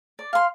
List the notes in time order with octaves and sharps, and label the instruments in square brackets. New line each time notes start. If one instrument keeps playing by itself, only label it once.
[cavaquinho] D5
F5 C6